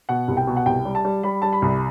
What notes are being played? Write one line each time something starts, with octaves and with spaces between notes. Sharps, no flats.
B2 F#5
C2
G5
B2
F#5
C2 G5
G3
A5
G3
G3 B5
G3 A5
B5
C2